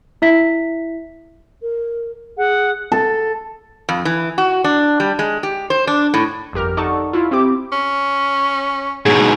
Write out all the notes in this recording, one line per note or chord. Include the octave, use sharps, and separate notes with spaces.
E4 E5 B6
A#4
G#4 F#5
A4
F2
E3
F#4
D4
G3
G#3
G4
C5
D4
A2
G1 F2 G4 A#4 F6
D#4 A4 D5 F#5 A5 C#6
E4 F4
C4 E4 G4 D6
C#4
G#2 B2 F#3 G#4